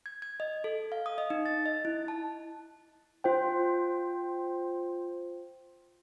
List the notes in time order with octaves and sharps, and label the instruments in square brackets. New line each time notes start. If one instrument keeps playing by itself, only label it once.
[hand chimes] G#6
G#6
D#5
A4
F5
D#6
D#5
D#4
A6
D#5
E4
A5
[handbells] F4 C5 G5